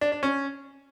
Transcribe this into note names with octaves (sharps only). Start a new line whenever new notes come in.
D4
D4
C#4